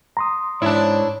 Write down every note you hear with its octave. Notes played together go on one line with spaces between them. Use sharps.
A#5 C6 D#6
G#2 D4 E4 C#5 D5